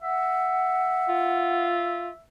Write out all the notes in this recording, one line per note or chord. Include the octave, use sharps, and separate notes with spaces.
E5 F#5
F4